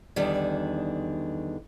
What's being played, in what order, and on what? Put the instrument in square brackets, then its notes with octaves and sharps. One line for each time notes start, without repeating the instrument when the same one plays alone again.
[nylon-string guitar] E2 D3 D#3 G3